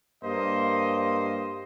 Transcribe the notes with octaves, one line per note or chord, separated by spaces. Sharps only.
G2 A#3 C5 D#5